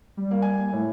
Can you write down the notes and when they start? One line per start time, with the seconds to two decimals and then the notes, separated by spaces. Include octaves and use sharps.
0.17 G3
0.31 A#3
0.42 G#5
0.72 A2